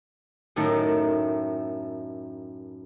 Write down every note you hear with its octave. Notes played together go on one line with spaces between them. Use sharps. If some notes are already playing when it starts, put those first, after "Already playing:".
F#2 A2 D#3 A3 A4 A#4